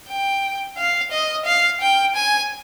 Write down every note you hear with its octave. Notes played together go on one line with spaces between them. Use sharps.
G5
F5
D#5
F5
G5
G#5